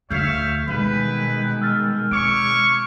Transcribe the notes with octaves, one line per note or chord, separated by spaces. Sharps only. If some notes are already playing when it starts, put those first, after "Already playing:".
D2 D3 C#5 E5 F5 G6
B2 D#3 G3 G#3 E4 B4
E6 F6 A6
C4 C#5 C#6 D6 F6 D7